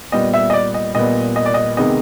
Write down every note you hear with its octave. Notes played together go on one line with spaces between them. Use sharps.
A#2 G3 B3 D#5
E5
D#5
D5
D#5
A#2 G3 B3 D#5
D#5
D5
D#5
C3 D#3 G#3 B3 D#5